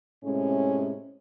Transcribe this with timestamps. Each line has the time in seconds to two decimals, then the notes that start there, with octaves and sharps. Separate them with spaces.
0.24 A2 C3 G#3 C#4